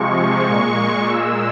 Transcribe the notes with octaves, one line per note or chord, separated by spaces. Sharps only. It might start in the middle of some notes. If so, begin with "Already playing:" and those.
Already playing: C3 F3 G#3 C#6
A#2 G#3
A#2 G#3 E6